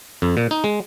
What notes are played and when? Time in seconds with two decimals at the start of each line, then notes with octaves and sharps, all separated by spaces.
0.22 F2
0.37 A#2
0.51 D#4
0.64 G#3